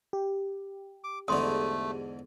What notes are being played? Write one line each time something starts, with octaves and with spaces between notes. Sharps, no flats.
G4
D6
E2 G#2 D3 A3 C6 D#6